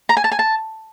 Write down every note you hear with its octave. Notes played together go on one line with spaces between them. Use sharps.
A#5
G#5
A5
G#5
A5